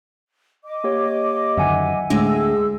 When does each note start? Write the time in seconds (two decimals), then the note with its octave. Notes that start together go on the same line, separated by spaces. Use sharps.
0.64 D#5 D6
0.84 A#3 G4 C#5
1.57 F#2 D3 D#3 E5 F#5 G#5
2.10 D2 A2 G#3 D4 G#4 E6